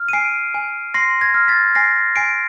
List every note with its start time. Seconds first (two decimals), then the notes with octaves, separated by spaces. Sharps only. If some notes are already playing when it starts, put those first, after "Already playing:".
Already playing: F6
0.09 D#7
0.13 G#5 C7 D7
0.54 G#5
0.94 C6 A#6 C7
1.21 G#6 A#6
1.34 F6
1.48 A6 B6
1.75 G#5 A#6 C7
2.16 G#5 C7 D7